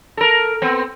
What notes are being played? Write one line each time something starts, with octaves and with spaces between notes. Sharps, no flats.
A4 A#4
B3 C4